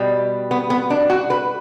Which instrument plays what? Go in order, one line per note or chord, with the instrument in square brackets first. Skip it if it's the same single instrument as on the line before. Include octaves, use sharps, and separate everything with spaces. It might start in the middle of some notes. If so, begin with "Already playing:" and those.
Already playing: [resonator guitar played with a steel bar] B2 G3
B3
B3
D4
F#4
B4